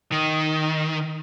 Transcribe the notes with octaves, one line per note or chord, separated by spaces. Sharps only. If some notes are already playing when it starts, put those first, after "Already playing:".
D#3